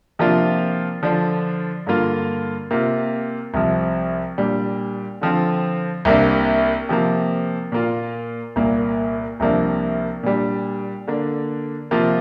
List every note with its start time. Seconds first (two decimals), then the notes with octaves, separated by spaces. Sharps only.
0.19 C3 F3 A#3 D4 F4
1.03 D3 F3 D4 F4
1.87 G2 D3 A#3 F4
2.71 C3 A#3 F4
3.54 C2 C3 F3
4.38 A#2 G3 D4
5.21 D3 F3 C4 F4
6.05 C2 C3 A#3 D4
6.89 C3 F3 A#3
7.72 A#2 A#3 F4
8.56 C2 A#2 A#3
9.40 C2 C3 F3 A#3 D4
10.23 A#2 G3 D4
11.07 D3 A#3 D4
11.91 C3 F3 A#3 F4